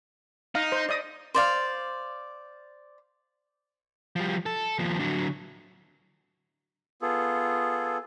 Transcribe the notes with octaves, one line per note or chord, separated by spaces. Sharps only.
D#4 F5
C5
D5 D#5 D#6
C5 D5 F5
F3 G3
A4
D#2 F3
D3 F#3
B3 F4 G#4 A4